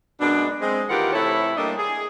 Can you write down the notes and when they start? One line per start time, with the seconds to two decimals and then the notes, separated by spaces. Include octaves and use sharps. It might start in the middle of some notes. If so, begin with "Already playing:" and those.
0.21 F#2 B2 G#3 D4
0.61 G#3 C4
0.90 D#2 E3 F4 G4 A#4 F#5
1.13 C3 E3 A3 E4 A4 C#5
1.57 G3 A3 A#3 D4 D5 D#5
1.78 G#4